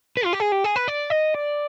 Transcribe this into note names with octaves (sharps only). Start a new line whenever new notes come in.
B4
F4
G4
G#4
G4
G#4
B4
D5
D#5
D5